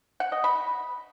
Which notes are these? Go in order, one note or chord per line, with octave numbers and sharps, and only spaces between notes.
F#5
D#5
B5